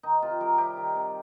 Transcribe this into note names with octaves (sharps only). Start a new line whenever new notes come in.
D#3 D#4
C3 F4
G3 A#4
C3 G4
D#3
C3